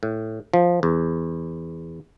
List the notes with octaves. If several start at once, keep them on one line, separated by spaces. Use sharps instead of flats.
A2
F3
E2